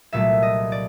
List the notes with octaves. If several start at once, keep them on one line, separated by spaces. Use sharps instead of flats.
C2 A#2 F#3 A3 E5
D#5
D5